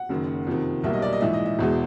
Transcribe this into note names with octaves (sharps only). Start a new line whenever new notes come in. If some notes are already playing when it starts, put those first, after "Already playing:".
Already playing: F#5
F#1 F#2 D#3
F2 C3 D#3
B1 B2 G3 A#3 E5
D#5
D5
D#5
A#1 G#2 E3 E5
D#5
E5
E1 E2 B2 G#3